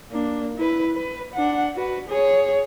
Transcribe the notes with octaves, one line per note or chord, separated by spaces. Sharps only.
A#3 D4
E4 B4
B4
D4 F#5
F#4 B4
G#4 C#5